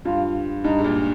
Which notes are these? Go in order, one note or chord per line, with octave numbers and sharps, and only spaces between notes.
G2 F4
G2 D#4
G#2
A#2